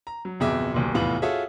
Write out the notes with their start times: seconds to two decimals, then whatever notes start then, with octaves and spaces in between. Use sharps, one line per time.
0.07 A#5
0.25 F#3
0.40 D1 F2 B2 G#4 E5 D6
0.74 D#1 B1 A#2
0.94 F1 E2 A2 B3 F4 F#7
1.22 F4 F#4 G#4 A4 C#5 E5